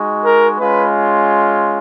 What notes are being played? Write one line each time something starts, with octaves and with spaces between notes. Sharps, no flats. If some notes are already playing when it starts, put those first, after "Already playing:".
Already playing: G#3 D#4 F#4
A#4
G#3 C#4 F4 B4